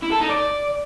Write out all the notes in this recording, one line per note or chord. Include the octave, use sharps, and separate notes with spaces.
E4
A4
D#4
D5